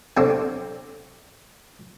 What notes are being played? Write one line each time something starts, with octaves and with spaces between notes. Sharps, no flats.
C3 F#3 C4 D4 F#4 A4